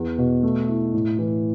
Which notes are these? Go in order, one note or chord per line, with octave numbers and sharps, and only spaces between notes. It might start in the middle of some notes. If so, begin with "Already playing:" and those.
Already playing: E2
B2
A3
E4
A2
E3